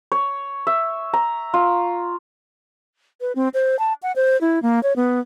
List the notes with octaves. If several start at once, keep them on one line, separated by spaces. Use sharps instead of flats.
C#5
E5
A#5
F4
B4
C4
C5
A5
F#5
C5
E4
A#3
C#5
B3